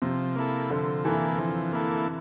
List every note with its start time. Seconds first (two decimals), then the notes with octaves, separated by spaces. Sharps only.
0.02 C3 F3
0.36 A#3 E4 A4
0.70 D3 F3
1.04 E3 A#3 E4 A4
1.38 F3
1.73 A#3 E4 A4